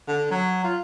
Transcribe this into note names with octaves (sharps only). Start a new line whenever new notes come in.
D3
F#3
F4